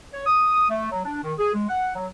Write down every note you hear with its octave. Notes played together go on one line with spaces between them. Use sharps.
C#5
D#6
A3
F#3
D4
D#3
G#4
G#3
F#5
F#3